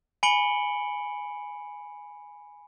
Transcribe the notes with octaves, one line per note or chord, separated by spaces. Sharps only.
G#5 B5 C#7 D7 F#7 G7